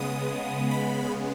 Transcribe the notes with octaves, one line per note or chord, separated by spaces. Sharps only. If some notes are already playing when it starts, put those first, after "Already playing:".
Already playing: C#3 G#3 B3 D#6
B5